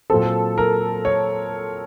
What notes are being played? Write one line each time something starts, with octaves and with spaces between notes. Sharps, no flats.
A#2 F#3 C4 A4
A#4
C#5